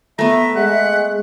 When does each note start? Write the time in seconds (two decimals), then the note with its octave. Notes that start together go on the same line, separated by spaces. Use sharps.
0.19 A3 B3 E5 A#5
0.56 G#3 F#5